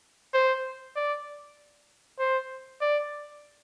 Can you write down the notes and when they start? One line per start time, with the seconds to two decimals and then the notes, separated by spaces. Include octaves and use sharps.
0.34 C5
0.96 D5
2.19 C5
2.81 D5